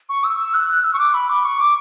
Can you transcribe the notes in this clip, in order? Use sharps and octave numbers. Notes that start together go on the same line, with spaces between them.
C#6
E6
E6
F#6
F#6
E6
C#6
D6
B5
D6
C#6
D6